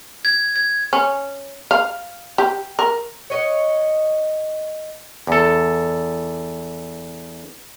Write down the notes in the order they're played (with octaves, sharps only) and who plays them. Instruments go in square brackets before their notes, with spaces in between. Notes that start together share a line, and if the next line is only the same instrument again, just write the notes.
[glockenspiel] G#6
G#6
[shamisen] C#4
F5
G4
A#4
[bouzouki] C#5 D#5 F#5
[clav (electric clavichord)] E2 A4